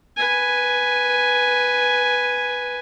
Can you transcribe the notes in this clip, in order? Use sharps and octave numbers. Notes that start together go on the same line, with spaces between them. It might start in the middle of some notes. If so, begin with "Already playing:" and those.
B4 G#5